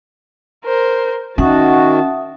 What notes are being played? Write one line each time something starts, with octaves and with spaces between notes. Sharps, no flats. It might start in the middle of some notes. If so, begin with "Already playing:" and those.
A#4 C5
D#3 C#4 F#4 E5 F#5 A5 D#6